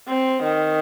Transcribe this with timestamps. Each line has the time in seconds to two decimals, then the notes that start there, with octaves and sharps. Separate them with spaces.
0.08 C4
0.44 D#3